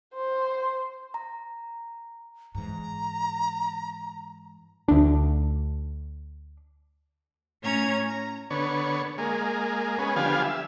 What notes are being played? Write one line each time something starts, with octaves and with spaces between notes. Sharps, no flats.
C5
A#5
G#2 E3 A#5
D2 D4
A2 C#4 C#5 A#5 G#6
A#5
D3 B3 C#5
G#3 A#3
G#3 B3 C#4
D3 F3 G3 B3 F5 G#5
E5